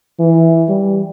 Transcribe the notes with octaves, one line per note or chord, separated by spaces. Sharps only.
E3
G3